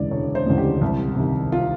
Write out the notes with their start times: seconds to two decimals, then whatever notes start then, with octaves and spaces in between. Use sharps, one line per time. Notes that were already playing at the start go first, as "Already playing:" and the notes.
Already playing: E1 D2 C#3 E3 G#3 D5
0.11 E1 C#5
0.35 C5
0.46 D2 C#3 E3 G#3
0.58 G4
0.81 C2
1.16 C3 D#3
1.52 F4